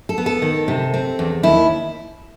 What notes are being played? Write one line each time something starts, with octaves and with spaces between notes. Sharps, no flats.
A4
B3
A4
D#3
C3
C4
E2
D#2 E4